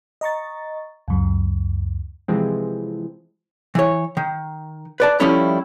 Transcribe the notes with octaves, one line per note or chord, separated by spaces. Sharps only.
D#5 A#5 C#6 A6
C#2 F#2
C3 E3 F3 G#3 C4
E3 C#5
D#3
B4 D5 A5
F3 G3 A3 C#4 E4